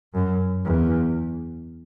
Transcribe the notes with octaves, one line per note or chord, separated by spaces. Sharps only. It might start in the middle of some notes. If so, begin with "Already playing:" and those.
F#2
E2